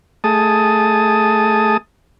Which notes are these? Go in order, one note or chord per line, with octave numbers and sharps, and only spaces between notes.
A3 G#4 A5 D#6